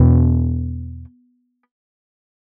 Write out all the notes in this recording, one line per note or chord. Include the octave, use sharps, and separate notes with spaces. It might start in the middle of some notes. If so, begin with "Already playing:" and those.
Already playing: E2 B2 B3